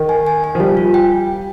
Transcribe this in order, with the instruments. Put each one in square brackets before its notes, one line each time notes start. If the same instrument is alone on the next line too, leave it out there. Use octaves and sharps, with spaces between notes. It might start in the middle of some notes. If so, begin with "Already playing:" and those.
Already playing: [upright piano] D#3
[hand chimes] G#5
G#5
G#5
[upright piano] F3
[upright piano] G3 [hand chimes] F4
[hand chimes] F4
G5